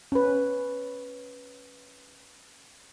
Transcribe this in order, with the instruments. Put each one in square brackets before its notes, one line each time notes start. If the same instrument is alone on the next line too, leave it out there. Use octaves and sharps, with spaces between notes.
[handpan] C#4 B4